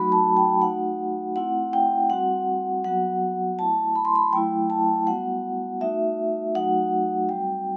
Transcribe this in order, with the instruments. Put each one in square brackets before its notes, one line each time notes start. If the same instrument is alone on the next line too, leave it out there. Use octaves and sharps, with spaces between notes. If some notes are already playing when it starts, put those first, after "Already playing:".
Already playing: [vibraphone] F#3 A3 D#4 F#4 B5
A5
G5
A3 D#4 F#4 F#5
A3 C4 E4 F#5
G5
G3 C4 F#4 F#5
F#3 B3 F#4 F#5
A3 E4 A5
B5
C6
B5
F#3 A3 E4 G5
A5
G3 B3 F#4 F#5
A3 D#4 F#4 E5
F#3 A3 D#4 F#4 F#5
G3 C4 F#4 G5